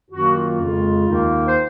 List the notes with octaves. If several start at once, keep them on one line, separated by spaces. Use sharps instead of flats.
F#2 D#3 F#3 A#3 F#4
F4
F2 C#3 G#3
D#2 D#3 A#3 D#4
C5